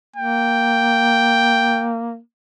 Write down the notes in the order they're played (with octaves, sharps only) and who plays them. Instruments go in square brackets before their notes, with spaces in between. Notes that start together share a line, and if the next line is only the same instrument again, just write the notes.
[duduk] A#3 [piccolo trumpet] G5